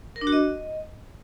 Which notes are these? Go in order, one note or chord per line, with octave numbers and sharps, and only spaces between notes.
A#4
D4
F#4
D#5